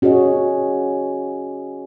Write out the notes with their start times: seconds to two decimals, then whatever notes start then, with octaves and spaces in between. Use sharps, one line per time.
0.02 C#4 F#4 G#4 C#5 D#5